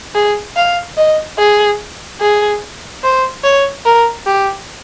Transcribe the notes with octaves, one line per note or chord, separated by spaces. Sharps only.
G#4
F5
D#5
G#4
G#4
C5
C#5
A#4
G4